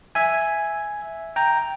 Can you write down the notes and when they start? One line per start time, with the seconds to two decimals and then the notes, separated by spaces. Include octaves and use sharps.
0.15 E5 G#5
1.36 G5 A#5